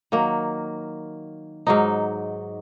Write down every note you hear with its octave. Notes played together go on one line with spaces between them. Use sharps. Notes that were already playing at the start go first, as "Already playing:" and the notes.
D#3 F#3 A#3
G#2 F#3 D#4